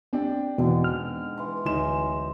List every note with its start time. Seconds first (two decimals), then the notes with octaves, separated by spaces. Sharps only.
0.13 C4 D4 G4
0.58 E2 G#2 B2 D3
0.84 F6
1.38 E3 C6
1.65 D1 D#4 G#4 C5 E7